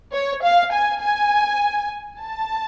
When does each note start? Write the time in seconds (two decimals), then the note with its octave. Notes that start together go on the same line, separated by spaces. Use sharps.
0.12 C#5
0.43 F5
0.72 G#5
1.01 G#5
2.20 A5